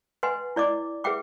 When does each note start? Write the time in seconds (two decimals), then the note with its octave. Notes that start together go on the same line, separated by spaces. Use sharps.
0.23 B4 D#5 F#5 G#5 C6
0.56 E4 D5 D#5 D6
1.04 G#4 B4 E5 F#5 G5 D6